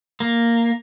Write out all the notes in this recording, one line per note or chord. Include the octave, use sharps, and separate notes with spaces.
A#3